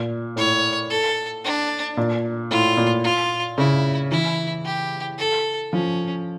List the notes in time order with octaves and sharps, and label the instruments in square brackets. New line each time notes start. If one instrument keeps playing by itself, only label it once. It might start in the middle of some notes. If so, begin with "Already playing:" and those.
Already playing: [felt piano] A#2
[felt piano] A2 [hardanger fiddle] C#5
[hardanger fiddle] A4
D4
[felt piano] A#2
[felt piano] A2 [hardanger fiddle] F4
[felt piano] A#2
[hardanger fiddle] F4
[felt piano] C#3 [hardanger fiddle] E4
[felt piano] E3 [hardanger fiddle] E4
[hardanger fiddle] G4
A4
[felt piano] F3 [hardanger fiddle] C#4